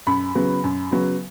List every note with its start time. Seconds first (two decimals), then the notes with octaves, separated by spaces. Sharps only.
0.07 F#2 B5
0.35 C#3 F#3 B3
0.64 F#2
0.91 C#3 F#3 B3